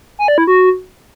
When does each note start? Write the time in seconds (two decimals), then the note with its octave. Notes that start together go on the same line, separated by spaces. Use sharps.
0.19 G#5
0.28 D5
0.38 E4
0.47 F#4